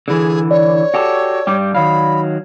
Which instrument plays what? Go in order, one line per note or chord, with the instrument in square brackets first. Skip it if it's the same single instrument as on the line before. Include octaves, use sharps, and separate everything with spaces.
[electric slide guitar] D3 E3 [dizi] G#4
[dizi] C#5 [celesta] D5
[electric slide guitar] F#4 G4 A4
G2 G3 G4
[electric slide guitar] D#3 F#3 F5 [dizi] B5